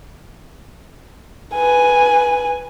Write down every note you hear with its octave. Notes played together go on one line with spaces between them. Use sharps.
B4 G#5